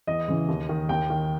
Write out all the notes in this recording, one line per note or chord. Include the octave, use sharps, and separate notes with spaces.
E2 D#5
C#3 E3
D#2
D#3
D#2 G5
D#3